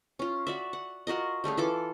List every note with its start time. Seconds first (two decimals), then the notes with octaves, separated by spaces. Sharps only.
0.19 C#4 F4
0.47 F#4 D5 E5
0.73 F#5
1.07 F4 F#4 A#4 D#5
1.44 G3 A3 C#4 G#4
1.57 E3 F4 A4 D6